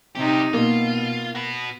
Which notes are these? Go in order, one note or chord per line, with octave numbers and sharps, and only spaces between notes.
G2 C3 D#4 G4
B2 A#3 F4
F#4 B4